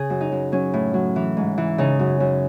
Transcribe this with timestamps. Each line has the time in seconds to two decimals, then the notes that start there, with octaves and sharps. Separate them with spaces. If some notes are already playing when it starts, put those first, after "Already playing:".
Already playing: C#3 G#4
0.10 F#2
0.21 D#4
0.32 F#2
0.52 F#3 C#4
0.74 A2
0.94 F#3
1.16 E3
1.37 G#2
1.58 E3
1.78 C#3 D#4
1.99 F#2
2.20 F#2